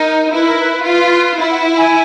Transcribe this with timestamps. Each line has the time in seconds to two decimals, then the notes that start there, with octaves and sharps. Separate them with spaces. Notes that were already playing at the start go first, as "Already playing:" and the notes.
Already playing: D#4 A#4
0.33 E4 B4
0.46 A#4
0.59 B4
0.72 B4
0.85 F4
1.38 E4
1.51 F#5
1.77 G#5